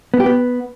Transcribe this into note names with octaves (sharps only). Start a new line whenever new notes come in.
B3
G4
B3